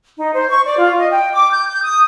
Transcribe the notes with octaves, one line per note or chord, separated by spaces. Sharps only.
D#4
C5
C#6
D5
F4
D#5
G5
D6
G6
G6
D#6